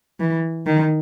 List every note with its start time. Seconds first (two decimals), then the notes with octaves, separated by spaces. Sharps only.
0.20 E3
0.67 D#3